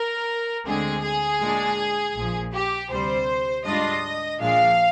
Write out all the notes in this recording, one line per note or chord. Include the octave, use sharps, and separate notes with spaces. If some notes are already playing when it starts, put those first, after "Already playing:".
Already playing: A#4
D2 D3 G#3 C4 G#4
G#4
A#2 G#3 D4
A#1 A#2 F3
G4
D2 C3 G3 C5
G#2 G3 D4 F4 D#5
A#1 A#2 F3 G#3 D4 F5